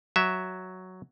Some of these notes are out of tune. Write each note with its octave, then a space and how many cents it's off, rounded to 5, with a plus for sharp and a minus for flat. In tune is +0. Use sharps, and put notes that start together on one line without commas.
F#3 +0 E5 -5